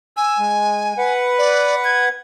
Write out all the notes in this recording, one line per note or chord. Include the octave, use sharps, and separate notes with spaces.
G#5 E6
G#3
B4 F#5
D5
G#6